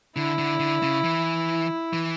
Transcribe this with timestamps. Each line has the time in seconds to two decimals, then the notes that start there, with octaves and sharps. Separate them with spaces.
0.16 D3 E4
0.38 D3
0.60 D3
0.82 C#3
1.04 E3
1.93 E3